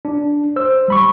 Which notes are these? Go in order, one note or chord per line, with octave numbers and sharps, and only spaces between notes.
D4
C5 E6
G3 B5 C#6